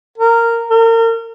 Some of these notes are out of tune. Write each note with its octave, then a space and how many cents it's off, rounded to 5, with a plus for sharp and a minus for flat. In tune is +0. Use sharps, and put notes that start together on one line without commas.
A#4 -10
A#4 -35